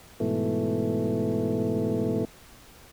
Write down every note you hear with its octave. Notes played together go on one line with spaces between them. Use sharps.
G#2 B2 E3 A3